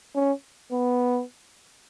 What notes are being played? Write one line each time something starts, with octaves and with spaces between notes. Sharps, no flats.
C#4
B3